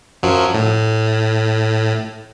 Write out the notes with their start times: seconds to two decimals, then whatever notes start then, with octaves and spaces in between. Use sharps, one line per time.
0.23 F#2 F3 F#3
0.54 A2